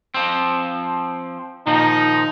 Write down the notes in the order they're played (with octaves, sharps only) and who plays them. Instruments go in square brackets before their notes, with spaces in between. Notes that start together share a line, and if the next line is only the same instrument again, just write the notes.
[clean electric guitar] F3 C4
[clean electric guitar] A#2 D#3 F3 [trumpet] D#4